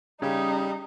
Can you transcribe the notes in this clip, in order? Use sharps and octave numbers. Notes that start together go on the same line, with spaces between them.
C#3 G3 C#4 D#4